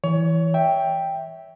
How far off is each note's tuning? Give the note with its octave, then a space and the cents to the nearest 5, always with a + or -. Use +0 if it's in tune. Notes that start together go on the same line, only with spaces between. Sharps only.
E3 +0 C#5 +25
E5 -10 G5 +0